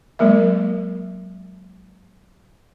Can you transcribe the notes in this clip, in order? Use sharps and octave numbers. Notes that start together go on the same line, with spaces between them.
F#3 G#3 A#3 A#4 E5